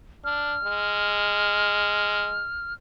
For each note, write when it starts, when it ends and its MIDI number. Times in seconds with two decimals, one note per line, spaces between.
0.25 0.57 62
0.25 2.73 89
0.64 2.50 56